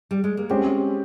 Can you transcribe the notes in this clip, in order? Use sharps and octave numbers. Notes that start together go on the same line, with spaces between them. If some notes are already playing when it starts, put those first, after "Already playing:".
G3
G#3
A#3
G#3 C4 C#4 G4 C5